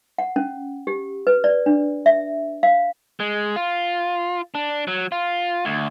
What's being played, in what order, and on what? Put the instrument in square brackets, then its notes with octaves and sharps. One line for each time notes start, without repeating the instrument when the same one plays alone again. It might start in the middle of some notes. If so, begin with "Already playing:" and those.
[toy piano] F#5
C#4
G4
B4
D5
D4
E5
F5
[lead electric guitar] G#3
F4
D4
F#3
F4
D2